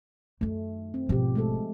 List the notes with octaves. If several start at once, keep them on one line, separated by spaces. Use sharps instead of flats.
F#2 D#3 A3
C4
G#1 B2 F3 G4
G#3 A3 A4